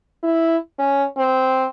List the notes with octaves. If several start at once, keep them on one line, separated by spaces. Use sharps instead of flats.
E4
C#4
C4